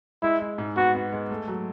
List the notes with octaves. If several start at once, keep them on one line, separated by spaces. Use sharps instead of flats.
G#3 E4
G#3
G#2
B3 F#4
B3
G#3
A3
F#3